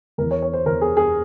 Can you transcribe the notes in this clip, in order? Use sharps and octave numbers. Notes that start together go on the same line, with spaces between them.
E2 E3 A#4
C#5
C#5
C5
E2 E3 A#4
G#4
G#4